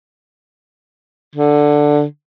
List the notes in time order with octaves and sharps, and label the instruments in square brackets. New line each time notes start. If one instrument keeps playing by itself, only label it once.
[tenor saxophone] D3